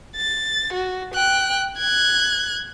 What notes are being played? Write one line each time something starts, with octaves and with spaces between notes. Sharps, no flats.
A6
F#4
G5 F#6
F#6 G#6